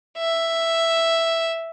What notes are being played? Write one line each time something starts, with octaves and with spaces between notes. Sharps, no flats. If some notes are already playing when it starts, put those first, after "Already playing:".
E5